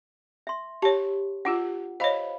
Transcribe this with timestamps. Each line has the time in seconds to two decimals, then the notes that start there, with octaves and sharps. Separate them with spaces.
0.47 E5 C6
0.82 G4 C#5 A5
1.45 D4 F4 G4 F#5
2.00 C5 C#5 D#5 F5 B5